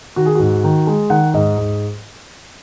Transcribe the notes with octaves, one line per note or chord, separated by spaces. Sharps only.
D#3 F#4
G#4
G#2 F#4
D#3
G#3
D#3 F#5
G#2 D#5
G#2